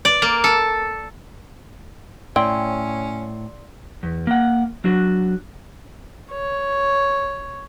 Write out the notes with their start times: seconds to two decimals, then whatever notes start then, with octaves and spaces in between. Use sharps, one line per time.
0.05 D5
0.22 A#3
0.44 A4
2.36 A2 C#4 D5 G5 C6 E6
4.03 E2
4.27 A#3 F#5
4.84 F#3 D4 F#4
6.31 C#5